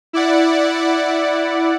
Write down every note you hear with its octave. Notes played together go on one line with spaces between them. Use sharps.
E4 D5 F#5